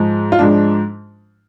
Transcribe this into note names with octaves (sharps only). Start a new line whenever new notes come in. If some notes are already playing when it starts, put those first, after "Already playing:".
Already playing: G#2 F3 G#3
F4
G#2 F3 G#3 D4